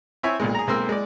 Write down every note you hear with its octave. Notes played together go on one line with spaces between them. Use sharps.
C4 E4 C#5 E5 G#5
B1 A#2 G#3
G#4 A#5
B1 G#3 A#3 C4 C6 E6
G#3 D5